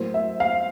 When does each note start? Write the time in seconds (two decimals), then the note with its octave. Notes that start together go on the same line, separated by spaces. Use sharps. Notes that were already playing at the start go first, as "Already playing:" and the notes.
Already playing: A2 F#3 A#3 C5
0.14 E5
0.40 F5